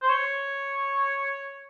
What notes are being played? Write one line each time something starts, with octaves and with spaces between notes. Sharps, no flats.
C5
C#5